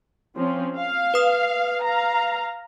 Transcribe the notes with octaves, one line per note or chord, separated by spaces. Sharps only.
F3 C4 C#4
F5
B4 D#6
F5 A#5